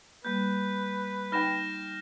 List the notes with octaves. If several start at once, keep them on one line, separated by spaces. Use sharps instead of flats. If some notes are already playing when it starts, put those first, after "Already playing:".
G3 A#3 B4 G6
D#4 G5 B5 F6 A#6 E7